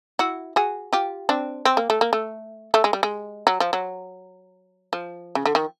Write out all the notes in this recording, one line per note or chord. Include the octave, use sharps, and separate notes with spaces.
E4 F#4
F#4 G#4
F4 G4
C4 D4
C4
A#3
A3
A#3
A3
A3
G#3
G3
G#3
F#3
F3
F#3
F3
C#3
D3
D#3